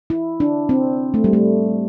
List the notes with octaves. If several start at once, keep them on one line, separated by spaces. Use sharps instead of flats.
E4
D4
C4
A3
G3
A3